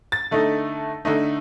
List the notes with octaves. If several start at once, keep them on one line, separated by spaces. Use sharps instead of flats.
A6
D3 A3 D#4
D3 A3 D#4